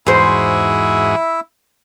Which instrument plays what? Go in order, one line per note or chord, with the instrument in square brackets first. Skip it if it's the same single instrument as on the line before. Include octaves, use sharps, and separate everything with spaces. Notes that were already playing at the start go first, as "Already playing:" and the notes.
[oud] E2 C5 [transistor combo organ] G#2 F#4 G#4 [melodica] E4 E5